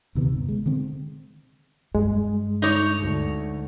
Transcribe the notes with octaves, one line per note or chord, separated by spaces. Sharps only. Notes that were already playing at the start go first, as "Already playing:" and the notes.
D2 C3 D#3 B3
G1
G#3
D3 D#3 C4
G2 G#3
D#4 C#5
D2